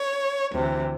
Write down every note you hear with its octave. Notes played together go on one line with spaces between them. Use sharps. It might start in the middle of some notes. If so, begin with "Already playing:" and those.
Already playing: C#5
D2 C3 E3